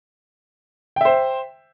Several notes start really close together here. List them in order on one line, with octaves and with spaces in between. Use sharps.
G5 E5 C5